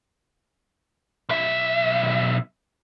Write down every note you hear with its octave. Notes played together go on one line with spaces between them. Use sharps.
B1 E5